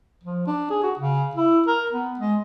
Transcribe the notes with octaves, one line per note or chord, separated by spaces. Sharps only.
F3
D4
G#4
F#4
C#3
E4
A#4
B3
G#3